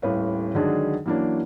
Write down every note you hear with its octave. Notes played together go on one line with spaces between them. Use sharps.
D#1 A2 B4 C#5 F5
D3 D#3 F#3 G#3 D4 G#4
E3 F#3 A#3 C#4 D4